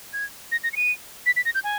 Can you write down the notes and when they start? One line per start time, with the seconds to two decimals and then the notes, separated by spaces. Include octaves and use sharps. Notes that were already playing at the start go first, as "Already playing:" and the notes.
0.13 G#6
0.52 A#6
0.64 A#6
0.73 C#7
0.76 D#7
1.26 B6
1.36 B6
1.45 A#6
1.55 G6
1.64 G#5